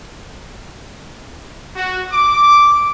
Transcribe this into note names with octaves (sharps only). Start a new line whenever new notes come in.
F#4
D6